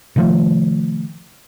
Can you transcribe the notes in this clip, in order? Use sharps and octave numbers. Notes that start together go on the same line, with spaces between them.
C3 D#3 F3 A3